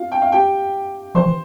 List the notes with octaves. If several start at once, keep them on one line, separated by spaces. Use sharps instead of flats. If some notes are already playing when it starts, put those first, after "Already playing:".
Already playing: F4 F5
G5
F5
G4 G5
F3 C5 C6
E3